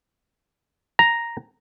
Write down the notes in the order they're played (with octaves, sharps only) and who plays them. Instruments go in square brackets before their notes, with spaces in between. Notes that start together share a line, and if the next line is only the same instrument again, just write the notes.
[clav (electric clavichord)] A#5